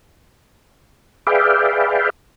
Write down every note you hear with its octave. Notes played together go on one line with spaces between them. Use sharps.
G#4 B4 D5 E5 F5 G5